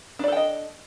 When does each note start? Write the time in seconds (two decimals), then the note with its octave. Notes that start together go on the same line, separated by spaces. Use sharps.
0.19 D4
0.24 D5
0.28 A4
0.32 G5
0.37 D#5